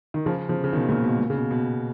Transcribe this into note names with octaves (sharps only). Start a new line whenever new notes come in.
D#3
C#3 F3
C#3 F3
C#3
B2 D#3
A#2 C#3
B2
A#2
C#3
B2
B2